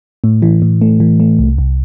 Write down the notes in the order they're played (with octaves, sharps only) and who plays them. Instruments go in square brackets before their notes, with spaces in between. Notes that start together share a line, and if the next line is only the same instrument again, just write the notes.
[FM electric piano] A2
E3
A2
A3
E3
A3
C2
C2